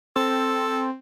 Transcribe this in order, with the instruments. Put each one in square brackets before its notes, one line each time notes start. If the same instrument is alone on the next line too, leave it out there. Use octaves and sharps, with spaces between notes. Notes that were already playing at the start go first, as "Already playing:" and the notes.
[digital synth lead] C4 [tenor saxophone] A4